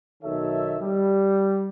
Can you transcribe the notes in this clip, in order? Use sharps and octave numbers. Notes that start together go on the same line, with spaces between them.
B1 D#3 A4 C#5 E5
G3